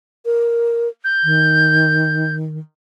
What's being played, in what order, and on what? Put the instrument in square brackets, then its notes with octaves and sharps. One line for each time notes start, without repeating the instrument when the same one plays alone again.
[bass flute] A#4
[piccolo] G6
[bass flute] D#3